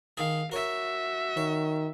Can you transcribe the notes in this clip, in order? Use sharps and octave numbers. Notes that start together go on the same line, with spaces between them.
D#3 G#4 F5
F#4 A#4 C#5 E5
D#3 C#5